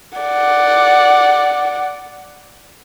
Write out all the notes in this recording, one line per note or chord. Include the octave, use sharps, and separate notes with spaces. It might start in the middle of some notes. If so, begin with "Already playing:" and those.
D5 F#5